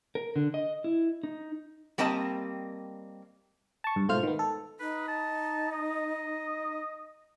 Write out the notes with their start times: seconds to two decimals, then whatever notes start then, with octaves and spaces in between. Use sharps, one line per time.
0.15 A#4
0.36 D3
0.54 D#5
0.84 E4
1.23 D#4
1.98 G3 A#3 C4 D#5 A5
3.84 A5 C#6
3.96 G2
4.08 G#2 B2 A3 F4 C5 F6
4.23 D#3 B3
4.39 A4
4.80 D#4 B4
5.08 A5
5.72 D#5